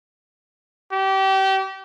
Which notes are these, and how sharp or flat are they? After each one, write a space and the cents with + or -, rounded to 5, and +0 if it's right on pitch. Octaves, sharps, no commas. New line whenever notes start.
G4 -30